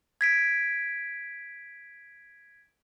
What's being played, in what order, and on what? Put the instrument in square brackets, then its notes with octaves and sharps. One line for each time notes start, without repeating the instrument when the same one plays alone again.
[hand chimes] G#6 B6 D7